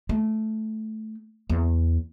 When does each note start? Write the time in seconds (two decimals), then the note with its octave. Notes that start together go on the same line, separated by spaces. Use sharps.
0.09 A3
1.50 E2